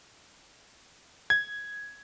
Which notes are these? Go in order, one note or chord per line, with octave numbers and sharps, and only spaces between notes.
G#6